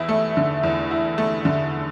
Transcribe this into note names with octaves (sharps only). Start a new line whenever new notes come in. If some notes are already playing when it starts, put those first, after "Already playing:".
Already playing: E2 E4
A3
D3
E2
E4
A3
D3